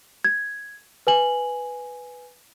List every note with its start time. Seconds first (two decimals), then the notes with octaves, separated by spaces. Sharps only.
0.25 G#6
1.07 B4 G#5 F#7